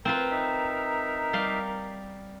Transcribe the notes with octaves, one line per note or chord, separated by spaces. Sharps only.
C4 F4 A#4 B4
D#4 E5
G3 F5 C6